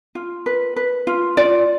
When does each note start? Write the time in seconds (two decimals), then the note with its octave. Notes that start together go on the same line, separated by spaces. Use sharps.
0.15 F4
0.46 B4
0.76 B4
1.07 F4
1.37 F4 D5